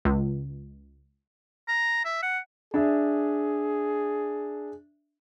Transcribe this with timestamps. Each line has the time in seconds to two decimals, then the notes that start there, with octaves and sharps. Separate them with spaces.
0.05 C#2
1.68 A#5
2.05 E5
2.23 F#5
2.74 D4 G#4 E5